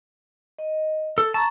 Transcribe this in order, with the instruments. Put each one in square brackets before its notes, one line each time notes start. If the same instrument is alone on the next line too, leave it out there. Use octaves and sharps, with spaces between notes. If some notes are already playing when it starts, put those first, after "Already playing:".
[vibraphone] D#5
[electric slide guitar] A4
[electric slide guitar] A5 [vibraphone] A#5 C#6